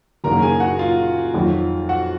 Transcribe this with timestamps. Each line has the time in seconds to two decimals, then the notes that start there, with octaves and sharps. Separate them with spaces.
0.24 F#1 F#2 D#3 F#3 A#3 A#4 A#5
0.42 G#4 G#5
0.60 F#4 F#5
0.79 F4 F5
1.34 F2 D#3 F#3
1.89 F#4 F#5